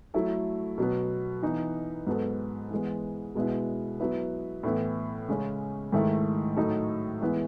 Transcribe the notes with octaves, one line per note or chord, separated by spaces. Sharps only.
F#3 A3 E4 A4
B2 F#3 B3
E3 B3 D#4
G#2 F#3 B3 F#4 A4
E3 G#3 B3
B2 G#3 B3 E4
F#3 B3 E4 B4
A2 E3 B3 E4
C#3 G#3 C#4
G#2 D#3 A3 E4
A2 F#3 A3 D#4 A4
E3 G#3 B3 E4